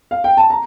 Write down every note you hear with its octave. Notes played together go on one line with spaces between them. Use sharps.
F5
G5
A5
A#5